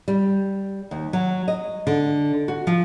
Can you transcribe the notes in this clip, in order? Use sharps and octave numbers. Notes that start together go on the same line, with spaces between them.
G3
D#2
F#3
D#5
D3
F#4
F3